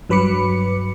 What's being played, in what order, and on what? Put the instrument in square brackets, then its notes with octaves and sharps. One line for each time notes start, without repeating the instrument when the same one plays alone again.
[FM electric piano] G2 F#3 B4 B5 D6 C#7